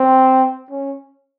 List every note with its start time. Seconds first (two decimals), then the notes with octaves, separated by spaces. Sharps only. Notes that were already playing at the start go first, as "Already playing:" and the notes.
Already playing: C4
0.70 C#4